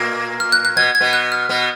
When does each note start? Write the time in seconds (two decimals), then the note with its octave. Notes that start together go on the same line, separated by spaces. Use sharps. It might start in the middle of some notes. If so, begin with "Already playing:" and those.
Already playing: A#2 A#3
0.40 F6
0.52 F#6
0.65 F#6
0.76 B2 B3 G#6
0.95 G#6
1.01 B2 B3
1.13 F#6
1.32 F6
1.49 B2 B3